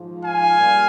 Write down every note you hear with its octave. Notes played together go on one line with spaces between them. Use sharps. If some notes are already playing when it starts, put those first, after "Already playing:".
Already playing: G#2 F3
F5 G#5
A#2 G3